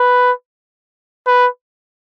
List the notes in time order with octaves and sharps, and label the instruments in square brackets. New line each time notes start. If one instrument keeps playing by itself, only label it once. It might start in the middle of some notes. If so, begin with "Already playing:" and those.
Already playing: [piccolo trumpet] B4
B4